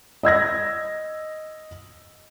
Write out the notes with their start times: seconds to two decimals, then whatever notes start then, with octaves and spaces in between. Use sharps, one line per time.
0.23 D#5 E6 G#6 A#6